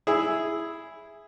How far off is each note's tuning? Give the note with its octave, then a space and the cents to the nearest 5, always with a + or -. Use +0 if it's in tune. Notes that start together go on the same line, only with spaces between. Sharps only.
E4 +0 G#4 +0 E6 +0